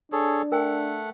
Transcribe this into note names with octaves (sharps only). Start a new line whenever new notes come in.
D4 G#4 A4 C#5
A3 A#4 F#5 G5